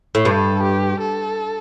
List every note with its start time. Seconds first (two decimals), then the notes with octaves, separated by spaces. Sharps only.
0.15 A2
0.25 G2 A4
0.63 G4
1.00 A4